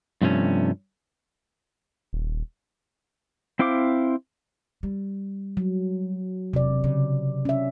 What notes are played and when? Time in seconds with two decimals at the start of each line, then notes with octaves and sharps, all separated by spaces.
0.22 G2 C3 F3 A3 C#4
2.13 D#1
3.59 C4 E4 C5 F5 D6
4.83 G3
5.57 F#3
6.53 E1 C3 D5
6.84 C#3
7.45 C#4 E5